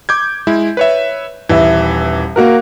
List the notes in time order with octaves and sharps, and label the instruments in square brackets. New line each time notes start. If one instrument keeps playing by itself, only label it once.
[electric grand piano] D6 G6 G#6
G#3 E4
B4 C#5 E5
[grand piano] D#1 E5 [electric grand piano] E3
[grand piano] A#3 F#4 A#4